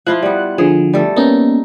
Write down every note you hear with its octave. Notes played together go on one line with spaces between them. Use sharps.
F3 E4 F4 F#6
G3 B3
D3 F3 G#4
G3 A3 A4
A#3 B3 C#4 D#4